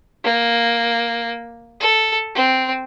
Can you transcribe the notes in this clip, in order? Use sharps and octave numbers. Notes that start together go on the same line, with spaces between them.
A#3
A4
C4